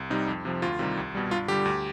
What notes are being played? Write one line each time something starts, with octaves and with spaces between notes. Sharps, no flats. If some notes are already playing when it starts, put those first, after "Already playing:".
Already playing: C2
C3 G3 D#4
F2
C3 F3
D2 F4
C3 D#3 G3
C2
B2 G3
G2 F4
D3 G3 G4
D2